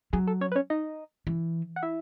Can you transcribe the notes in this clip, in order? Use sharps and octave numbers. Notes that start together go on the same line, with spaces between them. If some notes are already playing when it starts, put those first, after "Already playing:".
F#3 G#4
A4
C#4 C#5
B4
C#4 C#5
D#4 D#5
E3
F#5
E4 E5